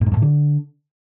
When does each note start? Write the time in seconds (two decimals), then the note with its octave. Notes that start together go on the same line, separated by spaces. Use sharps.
0.01 A2
0.06 G#2
0.12 F#2
0.17 A2
0.22 D3